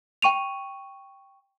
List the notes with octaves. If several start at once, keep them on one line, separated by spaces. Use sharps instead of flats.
G5 C#6 D#7 F7